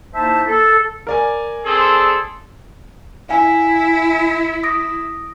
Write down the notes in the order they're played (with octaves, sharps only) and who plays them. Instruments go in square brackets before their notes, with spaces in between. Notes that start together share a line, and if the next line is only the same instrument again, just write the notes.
[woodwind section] A#3 D#4 E4 C5 E5 A5
A4
[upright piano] A#4 D5 G#5
[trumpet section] C4 G#4 A4
[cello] E4 [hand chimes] E5 F5 G#5
[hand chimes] D#6 A#6 D7